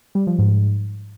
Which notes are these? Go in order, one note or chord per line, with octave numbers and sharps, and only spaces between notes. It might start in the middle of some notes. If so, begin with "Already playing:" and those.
G3
F3
G#2